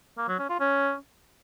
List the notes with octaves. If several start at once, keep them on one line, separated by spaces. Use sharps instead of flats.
A#3
F#3
C#4
F4
C#4